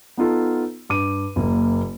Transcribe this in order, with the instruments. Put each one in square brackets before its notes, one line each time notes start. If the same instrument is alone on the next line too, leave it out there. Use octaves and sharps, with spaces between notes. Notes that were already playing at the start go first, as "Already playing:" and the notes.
[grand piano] B3 D#4 F4 A4
G2 D6 D#7
F#1 A#3